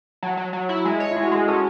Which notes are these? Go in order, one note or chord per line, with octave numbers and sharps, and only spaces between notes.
F#3 F#5 A5
F#3
F#3
E4
G#3 E5 G#5
C#5
E4
G#3
F#4
G#3 G#4
C#4 F#4 A4